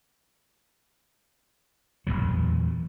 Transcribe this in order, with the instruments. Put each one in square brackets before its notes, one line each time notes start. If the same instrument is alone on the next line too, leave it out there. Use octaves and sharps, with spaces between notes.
[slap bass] E1 C2 A#2 F#3